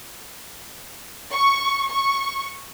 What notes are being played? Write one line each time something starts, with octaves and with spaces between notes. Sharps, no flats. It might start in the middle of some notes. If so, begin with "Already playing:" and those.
C#6
C#6